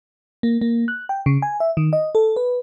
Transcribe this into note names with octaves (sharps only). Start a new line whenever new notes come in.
A#3
A#3
F#6
G5
C#3
G#5
E5
D#3
D#5
A4
B4